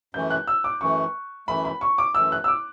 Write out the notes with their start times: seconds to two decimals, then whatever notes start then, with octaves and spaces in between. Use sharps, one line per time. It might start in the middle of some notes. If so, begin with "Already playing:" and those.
0.14 F#2 E3 A3 G6
0.30 F#6
0.47 E6
0.64 D6
0.81 F#2 E3 A3 C#6
1.48 F#2 E3 A3 B5
1.65 B5
1.81 C#6
1.98 D6
2.14 F#2 E3 A3 E6
2.32 F#6
2.44 E6
2.48 D6